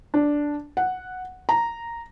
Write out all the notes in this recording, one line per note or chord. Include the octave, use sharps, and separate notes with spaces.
D4
F#5
A#5